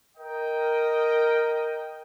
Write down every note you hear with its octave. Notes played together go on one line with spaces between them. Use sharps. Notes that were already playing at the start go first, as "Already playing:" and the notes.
A#4 D#5 G5